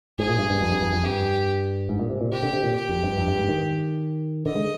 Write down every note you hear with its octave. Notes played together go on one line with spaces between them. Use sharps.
G#2 G#4
A#2
G2
G2
F2
G2
F2
F2
G2 G4
G#2
A#2
C3
A#2
C3 G4
D3
C3
A#2
G4
F2
G2
F2
G2
G#2
D#3
D3 D#5
G#3